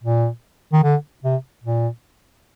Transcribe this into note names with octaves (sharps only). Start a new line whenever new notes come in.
A#2
D#3
D3
C3
A#2